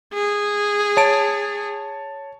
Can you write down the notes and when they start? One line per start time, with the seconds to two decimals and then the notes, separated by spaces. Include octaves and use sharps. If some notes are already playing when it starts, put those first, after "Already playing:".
0.14 G#4
0.97 C#5 A5 D7